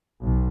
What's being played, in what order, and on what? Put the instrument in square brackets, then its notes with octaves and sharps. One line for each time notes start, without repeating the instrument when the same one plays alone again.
[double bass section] B1